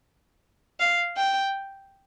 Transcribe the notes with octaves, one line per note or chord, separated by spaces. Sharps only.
F5
G5